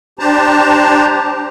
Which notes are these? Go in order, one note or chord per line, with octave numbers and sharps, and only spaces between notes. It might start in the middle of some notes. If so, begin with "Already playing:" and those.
D4 G4 C5 A5 A#5